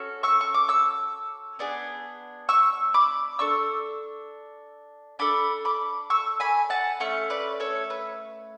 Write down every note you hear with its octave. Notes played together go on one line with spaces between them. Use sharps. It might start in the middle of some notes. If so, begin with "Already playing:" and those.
Already playing: C#4 F#4 A4
C#6 E6
C#6
D6
C#6 E6
B3 D4 G#4
C#6 E6
B5 D6
D4 A4 C#6 E6
D4 A4 B5 D6
B5 D6
C#6 E6
G#5 B5
F#5 A5
A3 C#4 C#6
B4 D5
A4 C#5
B4